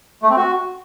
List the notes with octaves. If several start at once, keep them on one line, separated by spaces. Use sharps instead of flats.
A3
C4
F#4